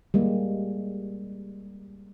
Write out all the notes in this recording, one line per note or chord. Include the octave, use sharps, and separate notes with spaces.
G3 G#3 A#3